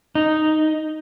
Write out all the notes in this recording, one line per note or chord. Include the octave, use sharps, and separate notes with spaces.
D#4